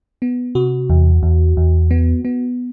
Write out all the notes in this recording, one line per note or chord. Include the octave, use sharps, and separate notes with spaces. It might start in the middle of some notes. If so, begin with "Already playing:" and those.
B3
C3 F#4
E2
E2
E2
B3
B3